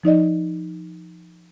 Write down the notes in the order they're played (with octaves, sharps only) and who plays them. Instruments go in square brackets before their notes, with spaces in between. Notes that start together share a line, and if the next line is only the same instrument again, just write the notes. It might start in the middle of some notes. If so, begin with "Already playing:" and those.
[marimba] F3 D#4 D5 D#5